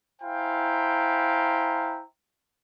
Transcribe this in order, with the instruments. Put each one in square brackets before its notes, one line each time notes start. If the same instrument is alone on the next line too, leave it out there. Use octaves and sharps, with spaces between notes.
[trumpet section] E4 C5 F5 G5 G#5 A#5